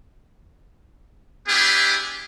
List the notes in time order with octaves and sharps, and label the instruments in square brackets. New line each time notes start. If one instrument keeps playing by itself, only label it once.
[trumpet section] G#3 B3 D4 E4 G4 G#4